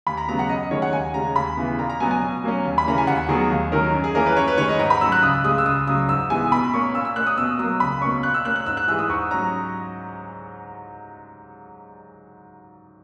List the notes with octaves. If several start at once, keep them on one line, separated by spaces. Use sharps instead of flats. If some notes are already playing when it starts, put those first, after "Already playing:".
D#2 B5
A#5
C#3 F#3 B3 A#5
F#5
F#2 D#5
D#5
D#3 G#3 C#4 C#5
F#5
D#2 G#5
C#3 G#3 C#4 A#5
D#2 B5
C#3 E3 B3
A#2 A#5
A#5
F#3 B3 G#5
G#5
B2
F#3 A#3 C#4
D#2
B5
C#3 E3 A#3 C#4 A#5
G#5
D#2 F#5
D#3 F#3 B3 G#4
D#2
D#3 F#3 C#4 A#4
F#2
G#4
E3 A#3 C#4 A#4
B4
F#2 C#5
B4
D#3 G#3 C#5
D#5
G#2 A#5
B5
F#3 C#4 E6
F#6
C#2 D#6
C#3 G#3 D#6
E6
C#2 D#6
C#3 F#3 D#6
G#2 E6
E3 G#3 B3 G#5
B2 B5
A#3 C#4 C#6
A#2 E6
E6
A#3 C#4 F#6
D#6
B2 E6
F#3 A#3 D#6
C#2 B5
B2 A#3 C#4 C#6
A#2 F#6
E6
A#3 C#4 F#6
F#6
G#2 E6
F#6
E3 G#3 E6
D#6
G#2 C#6
F#3 C#4 A#5